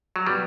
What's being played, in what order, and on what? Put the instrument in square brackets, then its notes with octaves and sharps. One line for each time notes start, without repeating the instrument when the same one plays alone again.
[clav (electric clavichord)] F#3
[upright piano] B2 F#3 B3 [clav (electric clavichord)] G3